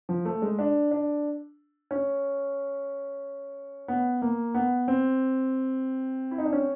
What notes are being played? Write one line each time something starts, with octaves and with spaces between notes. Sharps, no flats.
F3
A3
G#3
D4
D4
C#4
B3
A#3
B3
C4
E4
D#4
D4
C#4